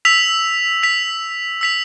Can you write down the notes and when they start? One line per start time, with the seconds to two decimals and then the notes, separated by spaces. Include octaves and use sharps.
0.05 E6 B6 F7
0.82 E6 B6 F7
1.61 E6 B6 F7